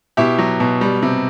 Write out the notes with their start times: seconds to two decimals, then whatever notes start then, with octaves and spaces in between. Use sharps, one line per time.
0.17 B2 E4 G4
0.38 F#3
0.60 B2
0.81 G3
1.02 C3